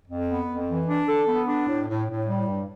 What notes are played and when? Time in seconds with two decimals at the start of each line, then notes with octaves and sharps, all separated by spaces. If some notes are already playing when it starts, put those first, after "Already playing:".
0.08 F2
0.28 B3
0.48 F2
0.68 E3
0.88 D4
1.08 A4
1.28 B3
1.47 D4
1.67 A2
1.87 A2
2.08 A2
2.27 G3
2.47 G2